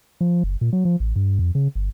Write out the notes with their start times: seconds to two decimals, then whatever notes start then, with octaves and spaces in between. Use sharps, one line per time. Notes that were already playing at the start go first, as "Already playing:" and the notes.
0.21 F3
0.43 F#1
0.61 A#2
0.73 F#3
0.85 F3
1.00 A1
1.16 G2
1.39 F2
1.55 C#3
1.75 G1